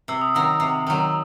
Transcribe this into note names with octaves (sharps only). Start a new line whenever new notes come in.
C3 E6
D#6
D#3 F#3 E6
C3
D#3 F#3
E6